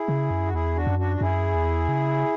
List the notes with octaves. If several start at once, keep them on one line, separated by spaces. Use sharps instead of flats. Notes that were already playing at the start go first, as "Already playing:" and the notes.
Already playing: E4 G#4
C#3
F#2
F#4
E2 E4 G#4
D4 F#4
F#2
D4 F#4
F#4
F#2 E4 G#4
E2
C#3